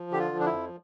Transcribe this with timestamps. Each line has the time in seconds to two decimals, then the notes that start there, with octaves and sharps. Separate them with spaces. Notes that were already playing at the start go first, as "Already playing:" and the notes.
Already playing: F3
0.11 D3 G4
0.19 F4
0.32 F3
0.40 D4
0.46 E4
0.52 F2